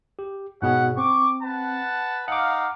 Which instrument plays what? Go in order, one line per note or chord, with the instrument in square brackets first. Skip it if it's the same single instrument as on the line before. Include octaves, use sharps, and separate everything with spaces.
[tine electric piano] G4
[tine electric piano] G#2 B2 G#4 [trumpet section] C#4 F#5
[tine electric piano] C4 [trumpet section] C#6 D6
[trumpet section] B4 F#5 A5
[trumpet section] D#4 F5 [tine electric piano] F#5 D6